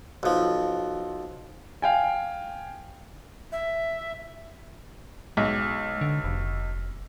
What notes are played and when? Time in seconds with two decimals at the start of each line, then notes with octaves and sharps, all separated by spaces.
0.23 B1 F3
1.82 F5 G5 G#5
3.52 E5
5.37 B1 G#3
6.01 D3
6.24 F1